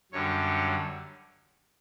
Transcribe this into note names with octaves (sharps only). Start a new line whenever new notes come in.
F#2 D3 G3 C#5